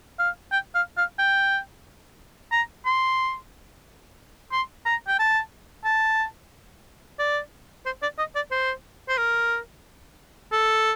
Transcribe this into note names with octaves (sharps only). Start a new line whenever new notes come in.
F5
G5
F5
F5
G5
A#5
C6
C6
A#5
G5
A5
A5
D5
C5
D5
D#5
D5
C5
C5
A#4
A4